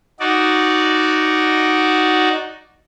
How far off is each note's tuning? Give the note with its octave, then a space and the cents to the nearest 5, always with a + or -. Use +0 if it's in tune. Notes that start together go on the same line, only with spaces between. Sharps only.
D#4 +0 F#4 +0 D5 -5